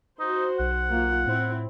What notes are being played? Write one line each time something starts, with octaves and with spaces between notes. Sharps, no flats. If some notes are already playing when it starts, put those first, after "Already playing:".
D#4 F#4 C5
B1 F#5
A#3 F4
A2 C4 E4